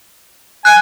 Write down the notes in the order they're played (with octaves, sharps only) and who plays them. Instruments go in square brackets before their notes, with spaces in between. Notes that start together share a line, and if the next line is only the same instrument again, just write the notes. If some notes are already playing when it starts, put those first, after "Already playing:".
[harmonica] G#5 [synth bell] F#6